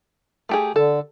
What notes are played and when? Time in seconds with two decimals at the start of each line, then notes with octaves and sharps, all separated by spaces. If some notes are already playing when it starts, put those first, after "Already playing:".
0.49 A3 G4 G#4
0.76 D3 A4